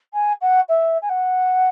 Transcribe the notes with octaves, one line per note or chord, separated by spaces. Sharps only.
G#5
F#5
E5
G#5
F#5